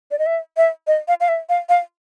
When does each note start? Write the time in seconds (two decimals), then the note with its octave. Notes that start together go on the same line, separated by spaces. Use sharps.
0.11 D5
0.19 D#5
0.26 E5
0.57 E5
0.87 D#5
1.08 F5
1.20 F5
1.28 E5
1.49 F5
1.69 F5